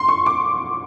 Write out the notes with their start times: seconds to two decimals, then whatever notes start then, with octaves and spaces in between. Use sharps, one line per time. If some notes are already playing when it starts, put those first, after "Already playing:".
Already playing: C6
0.09 C#6
0.26 D6